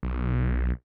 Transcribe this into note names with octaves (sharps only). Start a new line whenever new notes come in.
B1